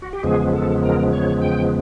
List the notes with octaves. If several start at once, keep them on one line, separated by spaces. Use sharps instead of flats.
F#4
G4
E2 C#3 F3 G#3 B3 G#4
A4
A#4
C#5
G5